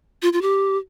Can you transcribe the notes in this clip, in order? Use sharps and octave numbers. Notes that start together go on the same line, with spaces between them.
F4
F4
G4